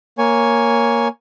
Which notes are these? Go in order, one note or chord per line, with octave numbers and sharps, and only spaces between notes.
A#3 C#5 G#5